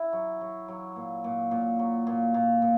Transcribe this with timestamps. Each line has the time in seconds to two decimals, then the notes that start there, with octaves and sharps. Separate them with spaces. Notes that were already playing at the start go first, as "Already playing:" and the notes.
Already playing: E4
0.13 F#3
0.41 F#3
0.68 F#3
0.96 A#2
1.24 A#2
1.51 A#2
1.79 F#3
2.07 A#2
2.34 A#2
2.62 A#2